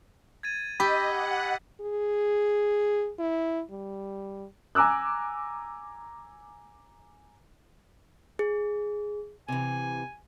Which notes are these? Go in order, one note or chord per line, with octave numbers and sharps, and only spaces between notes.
G#6 A6 D#7
G4 D#5 B5 E6 A6 B6
F#5
G#4
E4
G3
G#5 A#5 D6 E6 F#6
G#4
C3 E3 G#5